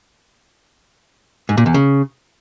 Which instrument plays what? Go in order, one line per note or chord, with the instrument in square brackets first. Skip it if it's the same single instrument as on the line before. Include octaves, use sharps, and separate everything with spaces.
[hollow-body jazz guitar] G#2
A#2
E2
C#3